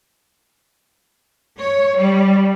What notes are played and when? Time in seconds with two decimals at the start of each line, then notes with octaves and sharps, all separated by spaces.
1.57 C#5
1.96 G3